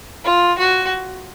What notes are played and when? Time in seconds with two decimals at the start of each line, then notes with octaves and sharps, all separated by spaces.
0.25 F4
0.58 F#4